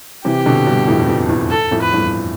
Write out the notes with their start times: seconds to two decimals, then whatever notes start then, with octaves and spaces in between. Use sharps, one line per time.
0.25 C3 E3 G4
0.46 B2 D3
0.67 G2 B2
0.88 F2 A2
0.99 E2
1.09 F2
1.29 E2
1.51 A4
1.71 F2 A2
1.82 B4
1.93 E2 G2